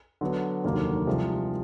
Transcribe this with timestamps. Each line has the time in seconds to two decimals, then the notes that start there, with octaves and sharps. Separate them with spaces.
0.21 D3 F#3 B3
0.64 F1 D#2 D3 F#3 A#3
1.07 C2 C3 F3 G#3